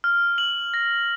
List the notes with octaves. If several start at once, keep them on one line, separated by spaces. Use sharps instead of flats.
F6
F#7
A#6